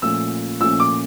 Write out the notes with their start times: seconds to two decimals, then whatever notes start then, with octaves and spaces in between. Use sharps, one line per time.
0.02 A#2 F3 A3 C#4 F4 E6
0.60 A#2 F3 A3 C#4 F4 E6
0.80 D6